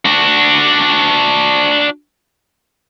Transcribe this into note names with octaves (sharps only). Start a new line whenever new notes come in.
D4 F#4